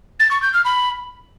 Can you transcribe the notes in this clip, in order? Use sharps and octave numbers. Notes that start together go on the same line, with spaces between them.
A6
C#6
G6
F6
B5